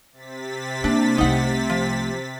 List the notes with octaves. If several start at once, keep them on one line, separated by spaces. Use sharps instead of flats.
C3 A6 B6
A#3 D4
C2 A3 D#4 F#5
F3